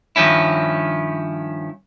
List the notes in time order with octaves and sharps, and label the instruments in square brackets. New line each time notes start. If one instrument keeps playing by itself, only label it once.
[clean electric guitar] G2 D#3 F3 C#4 E4